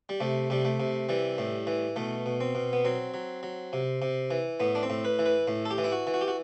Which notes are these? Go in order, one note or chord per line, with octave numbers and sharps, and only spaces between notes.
G3
C3 A3
C3 G3
A3
C3
E3 G3
A2
E3
B2 A3
B2
C4
B2
B3
F#3 C4
F#3
F#3
C3
C3
E3
A2 B3
D4
C4
A2
B4
E3
B4
A2
A4
G4
E3
E4
F#4
E3
F#4
G4
F#4